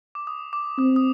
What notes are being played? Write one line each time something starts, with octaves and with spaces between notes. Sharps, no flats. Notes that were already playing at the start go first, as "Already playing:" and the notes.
D6
D#6
D6
C4 D#6
D#6